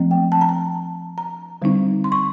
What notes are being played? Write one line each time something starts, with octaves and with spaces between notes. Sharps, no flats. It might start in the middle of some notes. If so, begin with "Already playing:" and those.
Already playing: F3 A3 C4
G5
A5
A#5
A5
A#5
D3 G3 C4 D#4
C6
C#6